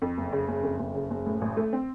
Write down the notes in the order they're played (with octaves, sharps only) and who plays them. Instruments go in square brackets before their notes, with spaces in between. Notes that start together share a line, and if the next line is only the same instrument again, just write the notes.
[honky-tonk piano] F2
F#1
C#3
F#1
F2
F#1
C#3
F#1
A2
A1
A3
C4